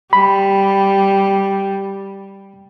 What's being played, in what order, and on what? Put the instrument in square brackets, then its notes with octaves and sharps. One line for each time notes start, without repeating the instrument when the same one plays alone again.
[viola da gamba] G3 [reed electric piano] B5